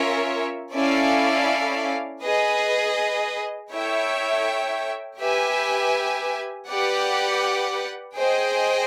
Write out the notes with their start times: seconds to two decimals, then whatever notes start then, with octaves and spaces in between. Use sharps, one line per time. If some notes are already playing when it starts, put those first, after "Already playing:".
Already playing: C#4 F4 A#4 C#5 E5
0.73 C#4 E4 A4 D5 F5
2.22 G#4 B4 D#5
3.70 E4 A4 C#5 E5 G5
5.19 G4 B4 E5 G#5
6.67 G4 B4 D5 F#5
8.16 G#4 C5 D#5 G5